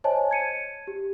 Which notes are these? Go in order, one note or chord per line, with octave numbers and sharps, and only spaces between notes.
C5 C#5 D#5 G#5 A5
G#6 C#7 D#7
G4